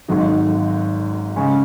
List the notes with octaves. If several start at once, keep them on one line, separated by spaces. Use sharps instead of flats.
G#1 G#2 F#3 D#4
C#2 C#3 G#3 C#4